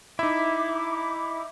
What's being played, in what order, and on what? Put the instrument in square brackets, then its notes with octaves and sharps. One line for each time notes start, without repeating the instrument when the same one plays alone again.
[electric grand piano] D#4 E5 [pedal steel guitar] E4 [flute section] D6